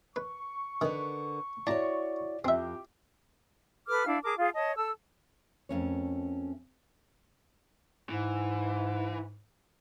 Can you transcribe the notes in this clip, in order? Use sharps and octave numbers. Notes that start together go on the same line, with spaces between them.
B4 C#6
D3 D#3 A#4 B4
E4 F#4 C#5 D5 A5 A#5
F2 C4 G4 E5
A4 B4 D6 F6
D4 E4 F5
G#4 A#4 A5 D6
F4 G#4 F5
C#5 D#5 A5
A4 A5 E6
F2 C#3 A3 C#4 A#4 C#5
G#2 E3